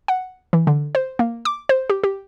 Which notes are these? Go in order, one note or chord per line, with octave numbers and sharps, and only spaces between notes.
F#5
E3
D3
C5
A#3
D6
C5
G4
G4